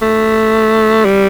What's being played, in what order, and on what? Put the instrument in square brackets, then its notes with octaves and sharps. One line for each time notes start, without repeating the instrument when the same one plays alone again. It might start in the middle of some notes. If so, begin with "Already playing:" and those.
[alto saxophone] A3
G3